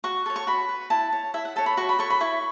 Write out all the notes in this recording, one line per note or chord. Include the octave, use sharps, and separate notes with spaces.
F#4 C#6
A4 C#5
C#6
F#4 B5
B4
E4 A5
C#5
E4 E5
F#5
A4 C#5 A5
B5
F#4 C#6
B5
A4 C#5 C#6
B5
E4 C#6